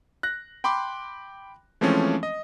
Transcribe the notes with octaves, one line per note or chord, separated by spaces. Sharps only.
F#6 A#6
G5 B5 C6 D6
E3 F3 G#3 A3 C4 C#4
D#5